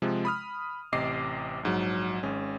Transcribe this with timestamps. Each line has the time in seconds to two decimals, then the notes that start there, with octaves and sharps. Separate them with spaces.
0.02 C3 F3 G#3
0.25 B5 D#6 F6
0.92 A1 C3 D#5 D6 C7
1.63 A#1 G#2 F#3
2.23 G#1 G#3 C#4